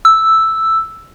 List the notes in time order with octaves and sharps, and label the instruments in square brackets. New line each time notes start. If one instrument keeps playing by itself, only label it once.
[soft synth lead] E6